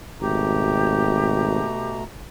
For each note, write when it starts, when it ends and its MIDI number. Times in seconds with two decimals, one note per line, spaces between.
0.21 1.60 32
0.21 2.03 47
0.21 2.03 57
0.21 1.96 67
0.21 2.03 82